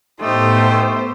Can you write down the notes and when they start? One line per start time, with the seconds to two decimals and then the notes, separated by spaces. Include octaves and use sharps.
0.21 A2 A3 B3 D#4 G4 C5